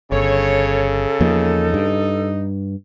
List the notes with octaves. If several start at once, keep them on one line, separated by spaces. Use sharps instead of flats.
G1 C#3 A4 C#5
E2 F3 A#3 D#4
G2